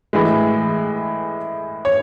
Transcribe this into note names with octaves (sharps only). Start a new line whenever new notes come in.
A2 E3 G#3
C#5